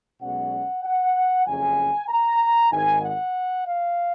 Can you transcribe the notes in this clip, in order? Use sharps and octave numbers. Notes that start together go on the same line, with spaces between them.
B1 B2 G#3 C#4 F#5
F#5
F#1 F2 C#3 G#5
A#5
G#1 G#2 D#3 G#5
F#5
F5